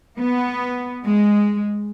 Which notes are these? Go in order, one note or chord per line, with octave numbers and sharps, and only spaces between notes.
B3
G#3